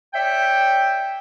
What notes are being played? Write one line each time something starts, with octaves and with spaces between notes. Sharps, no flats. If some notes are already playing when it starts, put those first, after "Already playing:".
C#5 D5 E5 G5